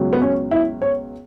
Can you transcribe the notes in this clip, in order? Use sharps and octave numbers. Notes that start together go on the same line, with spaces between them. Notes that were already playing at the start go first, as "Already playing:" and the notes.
Already playing: C#2 B2 F#3
B3
C#4
E4
C#5